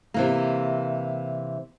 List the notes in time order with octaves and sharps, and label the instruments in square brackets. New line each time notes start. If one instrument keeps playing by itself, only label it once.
[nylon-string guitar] C3 E3 A#3